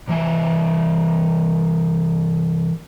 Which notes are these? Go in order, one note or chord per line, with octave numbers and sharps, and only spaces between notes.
C3 E3 E5 G#5